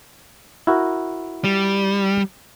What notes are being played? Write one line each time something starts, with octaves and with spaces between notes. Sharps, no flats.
E4 F#4 A#4
G3